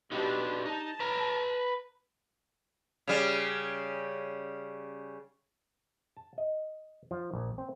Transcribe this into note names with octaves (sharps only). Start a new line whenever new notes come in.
D4 D#4 F#4 G4 B4
D#4 A5
B4 A#5
C#3 G3
A5
D#5
F3
A#1
C4